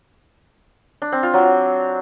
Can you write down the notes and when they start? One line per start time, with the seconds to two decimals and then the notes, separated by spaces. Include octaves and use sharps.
1.02 D4
1.12 C4
1.23 F4
1.34 F#3